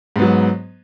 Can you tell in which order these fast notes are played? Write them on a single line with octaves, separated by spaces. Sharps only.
G#2 B3 F#3